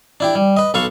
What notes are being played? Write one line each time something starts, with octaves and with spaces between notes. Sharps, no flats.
D4 E4 G4
G3
B4 D#5
B1 A4 B4 F5 C#6